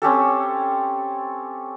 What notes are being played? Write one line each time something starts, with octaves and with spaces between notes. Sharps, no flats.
C4 C#4 G4 A4